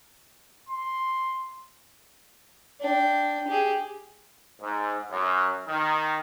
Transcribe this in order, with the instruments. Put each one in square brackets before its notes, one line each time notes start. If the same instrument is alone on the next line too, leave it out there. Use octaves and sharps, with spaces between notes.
[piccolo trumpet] C6
[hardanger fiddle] D4 G5
G4 G#4
[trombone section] G#2
F#2
D#3